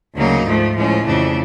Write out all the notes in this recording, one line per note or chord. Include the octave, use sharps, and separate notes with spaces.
D2 C#3 F#3 A#3 D#4
G#2 F3 A3
A2 F3 G#3 C#4
F2 C#3 E3 A3 D4